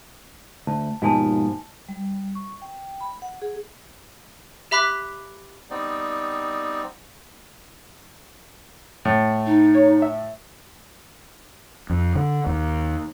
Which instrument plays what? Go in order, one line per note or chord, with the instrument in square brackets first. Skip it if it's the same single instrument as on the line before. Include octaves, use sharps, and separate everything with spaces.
[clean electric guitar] D2 [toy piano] A5
[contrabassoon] D#2 [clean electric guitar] G#2 B2 F3 [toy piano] F5 G#5 A5
[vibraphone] G3
C#6
G5
B5
F#5
G#4
[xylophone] G4 E5 B5 D6 F#6 B6
[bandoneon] G3 B3 C4 D#4 D5
[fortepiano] A2
[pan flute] D#4
[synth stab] C#5
E5
[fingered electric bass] F2
D3
D#2